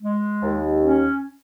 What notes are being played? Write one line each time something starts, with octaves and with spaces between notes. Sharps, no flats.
G#3
D#2
C#4